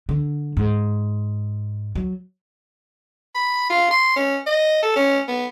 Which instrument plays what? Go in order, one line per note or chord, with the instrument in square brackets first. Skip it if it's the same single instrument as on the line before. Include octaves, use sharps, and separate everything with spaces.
[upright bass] D3
G#2
F#3
[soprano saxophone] B5
F4
C6
C#4
D#5
A4
C#4
B3